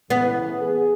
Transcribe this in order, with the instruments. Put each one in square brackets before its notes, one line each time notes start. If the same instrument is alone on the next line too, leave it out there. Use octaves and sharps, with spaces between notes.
[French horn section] A2 C#3 E3 [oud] B3
[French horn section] G#4